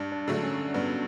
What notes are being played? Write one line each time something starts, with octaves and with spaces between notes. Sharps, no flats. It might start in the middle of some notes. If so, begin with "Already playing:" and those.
Already playing: G2 D4
D4
D3 F#3 A3
C#4
G2 B3